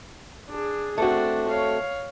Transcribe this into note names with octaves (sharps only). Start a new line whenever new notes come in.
D4 G#4
A3 C4 D4 F#4
C#5 F5